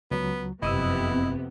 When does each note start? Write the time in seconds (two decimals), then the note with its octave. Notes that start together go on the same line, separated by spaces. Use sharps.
0.11 C#2 F#3 B3
0.62 F#1 F2 C3 B3 E4 D#5 D#6 E6